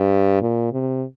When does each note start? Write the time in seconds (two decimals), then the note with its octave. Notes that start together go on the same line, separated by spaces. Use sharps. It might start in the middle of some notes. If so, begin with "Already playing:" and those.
Already playing: G2
0.42 A#2
0.72 C3